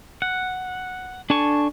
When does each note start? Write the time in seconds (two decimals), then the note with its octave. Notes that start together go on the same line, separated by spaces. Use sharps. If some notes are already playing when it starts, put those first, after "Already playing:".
0.22 F#5
1.30 D4 A4 G#5 A5 C#6